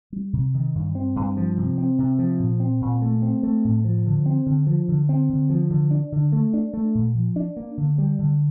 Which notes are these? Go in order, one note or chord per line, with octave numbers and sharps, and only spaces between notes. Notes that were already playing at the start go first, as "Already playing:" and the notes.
G3
C3
D#3
G2
C4
G2
F3
C3
C4
C3
F3
A#2
C4
A#2
A3
C4
A3
A2
F3
D3
C4
D3
F3
D3
C4
D3
F3
D3
D4
D3
A3
D4
A3
A#2
F3
D4
A#3
D3
G3
D3